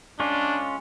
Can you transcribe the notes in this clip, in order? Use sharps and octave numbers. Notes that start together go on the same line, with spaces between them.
G#3 C#4 D4 F4